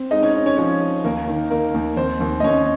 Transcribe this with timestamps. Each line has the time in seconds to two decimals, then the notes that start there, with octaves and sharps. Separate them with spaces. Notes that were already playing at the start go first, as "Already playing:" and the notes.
Already playing: C4
0.11 G#3 D#4 D#5
0.22 C#4 C#5
0.35 C#4
0.46 C#4 C#5
0.57 F3 C#4 C#5
0.81 C#4
1.04 D#2 A#3 A#4
1.28 D#3
1.50 D#3 A#3 A#4
1.74 D#2
1.97 D#2 C4 C5
2.20 D#2
2.40 D#5
2.43 D#2 C#4 C#5